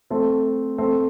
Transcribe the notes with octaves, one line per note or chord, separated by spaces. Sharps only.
A3 C4
A3 C4